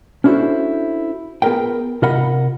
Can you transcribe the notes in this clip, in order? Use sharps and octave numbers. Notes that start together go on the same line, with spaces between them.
C#4 D4 E4 F#4 A4 C5
B3 F4 G#4 A#4 B4 G5
C3 F4 A#4 D#5 F#5 B5